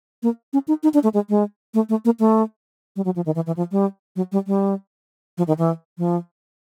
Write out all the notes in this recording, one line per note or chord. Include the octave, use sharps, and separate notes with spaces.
A#3
C#4
D#4
D#4
D4
A3
G#3
G#3
A3
A3
A#3
A3
G3
F#3
F3
D#3
E3
E3
F3
G3
F#3
G3
G3
F3
D#3
E3
F3